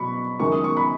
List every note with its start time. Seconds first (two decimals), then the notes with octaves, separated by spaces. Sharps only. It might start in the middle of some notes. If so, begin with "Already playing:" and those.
Already playing: B2 F#3 B5 C#6
0.40 F#2 D#3 G#3 C#6
0.52 D#6
0.64 C#6
0.77 B5